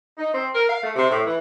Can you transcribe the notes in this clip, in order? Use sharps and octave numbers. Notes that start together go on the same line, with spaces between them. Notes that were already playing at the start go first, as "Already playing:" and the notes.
D#4
C4
A#4
F5
A3
C3
A2
E3